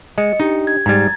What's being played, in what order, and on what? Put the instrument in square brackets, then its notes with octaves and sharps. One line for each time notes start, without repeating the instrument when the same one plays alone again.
[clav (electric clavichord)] G#3 [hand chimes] D#5 C#7
[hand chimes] D4 G4 [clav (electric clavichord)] D#4
[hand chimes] G#6
[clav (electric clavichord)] G#2 G3 [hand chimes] A#5 G#6 A6